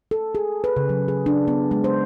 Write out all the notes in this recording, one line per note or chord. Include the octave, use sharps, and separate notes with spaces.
A4
G#4
B4
C#3
F#3
G#4
D4
B3
G#3
C5